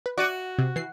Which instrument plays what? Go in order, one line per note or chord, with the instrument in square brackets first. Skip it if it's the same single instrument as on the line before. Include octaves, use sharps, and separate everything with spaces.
[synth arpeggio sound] B4
[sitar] F#4 [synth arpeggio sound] D5 D6 D#7
[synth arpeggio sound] C3
E3 C7